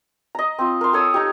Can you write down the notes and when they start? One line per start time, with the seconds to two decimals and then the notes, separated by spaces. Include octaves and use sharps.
0.35 D#5 A#5
0.59 C4 F4
0.81 A#4 C6
0.93 A4 C#5 D#6 E6
1.14 D#4 G4